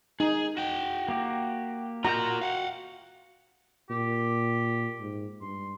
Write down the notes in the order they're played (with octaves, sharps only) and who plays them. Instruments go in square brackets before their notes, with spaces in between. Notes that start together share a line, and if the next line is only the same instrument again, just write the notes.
[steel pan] D#4 [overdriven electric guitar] G#4
[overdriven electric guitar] F#4 G5
[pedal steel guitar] A#3 G4
[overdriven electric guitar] F4 A#4 [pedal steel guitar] F#4 G6 [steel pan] A#5
[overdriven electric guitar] F5 F#5
[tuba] A#2 [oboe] G4
[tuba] G#2
[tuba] G2 [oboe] C6